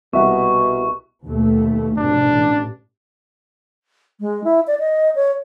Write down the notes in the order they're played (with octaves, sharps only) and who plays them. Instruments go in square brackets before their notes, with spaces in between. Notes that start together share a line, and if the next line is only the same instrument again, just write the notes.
[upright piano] C2 E5 F#5 [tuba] B2 [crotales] C#6
[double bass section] D#2 B2 A3
[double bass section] F1 G#2 B2 [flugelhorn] D4
[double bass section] A1
[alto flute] G#3
E4
D5
D#5
C#5